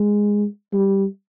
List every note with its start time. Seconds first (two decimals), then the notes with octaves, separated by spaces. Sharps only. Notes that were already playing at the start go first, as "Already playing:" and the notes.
Already playing: G#3
0.73 G3